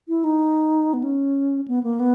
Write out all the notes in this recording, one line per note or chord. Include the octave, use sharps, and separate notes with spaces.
E4
D#4
B3
C#4
B3
A#3
B3